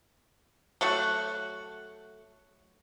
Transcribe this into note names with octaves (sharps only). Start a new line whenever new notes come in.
F#3 A3 F#4